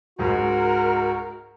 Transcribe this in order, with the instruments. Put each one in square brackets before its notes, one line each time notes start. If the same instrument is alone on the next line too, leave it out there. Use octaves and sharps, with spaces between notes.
[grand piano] C#2 G#2 G#3 [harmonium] F#4 [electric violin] A#4